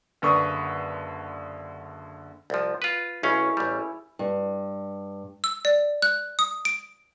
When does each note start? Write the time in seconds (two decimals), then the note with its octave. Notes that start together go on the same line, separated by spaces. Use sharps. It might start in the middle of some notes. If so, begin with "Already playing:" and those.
0.22 F#1 D3 B4 C#6 D#6
2.50 C2 F3
2.82 F4 B4
3.23 B1 C#4 E4 G#4 C#5 F5
3.57 A1 G3
4.19 G2
5.44 E6
5.65 D5
6.02 F#6
6.39 D#6
6.65 D7